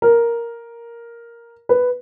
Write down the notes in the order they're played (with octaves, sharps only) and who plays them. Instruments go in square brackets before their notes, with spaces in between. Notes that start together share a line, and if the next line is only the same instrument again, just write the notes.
[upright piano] A#4
B4